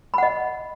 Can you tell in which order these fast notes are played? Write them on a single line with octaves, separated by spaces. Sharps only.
B5 F#5 D#5